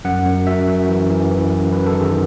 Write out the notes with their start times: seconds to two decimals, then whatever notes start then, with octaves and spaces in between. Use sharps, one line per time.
0.05 F#2 F#5
0.26 F#2
0.47 F#2 E5
0.67 F#2
0.89 E3
1.10 E3
1.30 E3
1.52 F#2
1.72 F#2 B4
1.87 A4
1.94 D#3
2.01 G#4